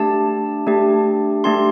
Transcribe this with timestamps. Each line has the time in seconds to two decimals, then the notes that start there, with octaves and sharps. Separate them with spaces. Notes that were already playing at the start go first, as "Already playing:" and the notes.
Already playing: A3 D4 G4 A5
0.67 A3 D4 G4
1.44 A3 D4 G4 C6